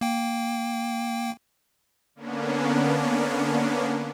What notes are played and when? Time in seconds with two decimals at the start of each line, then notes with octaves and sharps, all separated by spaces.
0.01 A#3 G5
2.15 D3 A#3 B3 C#4 D4